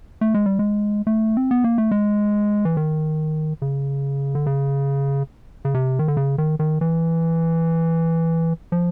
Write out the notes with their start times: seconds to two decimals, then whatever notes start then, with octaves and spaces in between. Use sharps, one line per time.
0.21 A3
0.34 G#3
0.46 G3
0.59 G#3
1.07 A3
1.37 C4
1.51 B3
1.64 A#3
1.78 A3
1.91 G#3
2.65 E3
2.77 D#3
3.62 C#3
4.35 D3
4.46 C#3
5.65 C#3
5.74 C3
5.99 D#3
6.08 D3
6.17 C#3
6.38 D#3
6.59 D#3
6.81 E3
8.72 F3